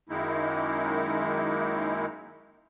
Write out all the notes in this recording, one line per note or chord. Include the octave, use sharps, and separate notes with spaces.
F#2 D#3 G#3 A#3 D#4 E4